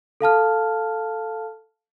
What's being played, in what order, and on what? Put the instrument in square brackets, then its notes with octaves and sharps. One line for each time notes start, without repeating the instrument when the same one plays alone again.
[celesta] A4 F5 A5 F6